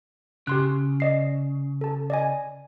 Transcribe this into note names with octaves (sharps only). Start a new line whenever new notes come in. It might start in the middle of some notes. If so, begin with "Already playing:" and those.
C#3 G4 C6 F#6
D5 D#5 C7
A4 A5
D5 D#5 G#5